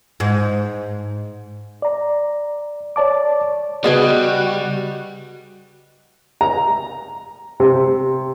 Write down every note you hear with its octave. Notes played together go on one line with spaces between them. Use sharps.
G#2
D5 A#5
C#5 D5 A5 D6
C#3 G3 B3 F#4 G#4 B4 D#5
A#5
C3